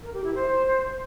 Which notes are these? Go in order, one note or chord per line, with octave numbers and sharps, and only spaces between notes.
A#4
G4
E4
C5